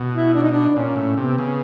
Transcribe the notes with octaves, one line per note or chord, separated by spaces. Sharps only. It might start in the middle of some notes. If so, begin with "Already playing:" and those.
Already playing: B2
E4
D4
D#4
D4
A#2 C#4
A2
C3 B3
C#3